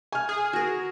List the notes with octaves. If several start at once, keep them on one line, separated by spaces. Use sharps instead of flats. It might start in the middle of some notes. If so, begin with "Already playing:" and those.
G#5 F6
G#4
F#4 A#4